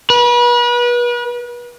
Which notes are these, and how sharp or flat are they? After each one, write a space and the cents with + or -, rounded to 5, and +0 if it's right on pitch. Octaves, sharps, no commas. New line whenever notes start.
B4 -35